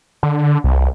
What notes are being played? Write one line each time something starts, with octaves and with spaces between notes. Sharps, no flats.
D3
C2